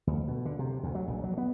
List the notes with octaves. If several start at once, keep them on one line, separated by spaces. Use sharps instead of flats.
D2
B2
D3
C3
D2
F#3
A#1
F#3
B3